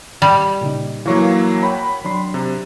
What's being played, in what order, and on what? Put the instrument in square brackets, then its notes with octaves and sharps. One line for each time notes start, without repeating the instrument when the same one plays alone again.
[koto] G3
[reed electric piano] A#2 C#3 D#4
[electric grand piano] E3 F#3 A#3 [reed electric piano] F5 C#6
[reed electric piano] C#5 F#5 G5 [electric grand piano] B5
[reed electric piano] F#3 D4 C6
[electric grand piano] C3